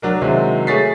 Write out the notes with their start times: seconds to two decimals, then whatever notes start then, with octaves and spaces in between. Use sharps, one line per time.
0.02 F#3 D4 A#4
0.22 C3 D#3 F#3 G#3 E4
0.67 A3 G#4 C#5 A6 B6 C7